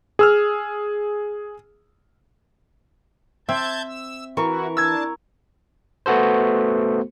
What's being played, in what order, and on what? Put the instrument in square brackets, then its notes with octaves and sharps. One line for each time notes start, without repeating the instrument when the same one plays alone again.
[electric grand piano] G#4 E6 F6
[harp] C4 [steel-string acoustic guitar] E5 [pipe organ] A5 G6 G#6
[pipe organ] E6
[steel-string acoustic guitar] E3 [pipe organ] E4 F#4 [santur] A#4 C#6
[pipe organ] D4 A5 [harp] E6 G#6
[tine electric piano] A3 B3 F#4 A4 C5